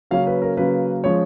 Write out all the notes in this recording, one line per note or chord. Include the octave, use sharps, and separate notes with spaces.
C#3 F#3 A#3 C#4 F5
B4
A#4
C#3 F#3 A#3 C#4 B4
F3 G#3 C#4 C#5